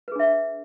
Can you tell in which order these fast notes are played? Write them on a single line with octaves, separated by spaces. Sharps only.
B4 G#4 D4 E5